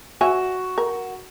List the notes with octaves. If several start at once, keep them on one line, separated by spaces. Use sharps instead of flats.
F#4 C#5 E5 G#5
A#4